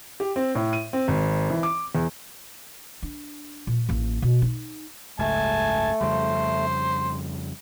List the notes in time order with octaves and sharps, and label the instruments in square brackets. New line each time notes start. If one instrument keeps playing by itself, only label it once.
[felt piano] G4
C4
A2
D#7
C4
G#1
E3
D6
E2
[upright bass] D4
A#2
A1 A#3
B2
D#4
[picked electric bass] F#1 C#2 G#2 [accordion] A3 [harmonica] G#5 A5
[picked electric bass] F2 C#3 G3 [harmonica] C5